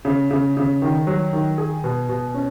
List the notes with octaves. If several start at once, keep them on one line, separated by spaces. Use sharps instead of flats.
C#3
C#3
C#3
D#3
F#3
D#3
G#4
B2
B2
C#4